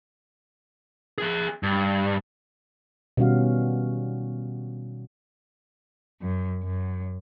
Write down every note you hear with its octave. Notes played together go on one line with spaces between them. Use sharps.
G#4 E5
G2
B2 D#3 G3 C#4 F#4 F5
F#2
F#2